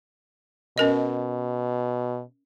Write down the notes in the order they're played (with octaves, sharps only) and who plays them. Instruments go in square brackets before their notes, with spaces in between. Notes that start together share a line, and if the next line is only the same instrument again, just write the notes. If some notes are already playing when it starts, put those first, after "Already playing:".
[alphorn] B2 [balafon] C#4 A#4 D#5